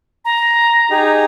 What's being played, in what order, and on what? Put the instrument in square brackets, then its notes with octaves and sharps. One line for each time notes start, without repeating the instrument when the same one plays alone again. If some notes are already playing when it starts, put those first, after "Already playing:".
[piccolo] A#5
[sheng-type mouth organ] D#4 G4 G#4